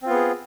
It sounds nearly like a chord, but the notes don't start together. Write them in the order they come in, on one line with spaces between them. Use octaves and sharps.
C4 F4 B3 G#4